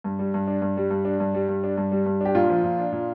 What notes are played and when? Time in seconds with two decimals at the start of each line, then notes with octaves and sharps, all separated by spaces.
0.04 G2
0.19 G3
0.34 G2
0.47 D4
0.62 G2
0.77 G3
0.90 G2
1.05 D4
1.20 G2
1.34 G3
1.49 G2
1.64 D4
1.77 G2
1.92 G3
2.06 G2
2.21 D4 G4
2.35 A#2 F4
2.50 F3
2.64 A#2
2.78 D4
2.92 A#2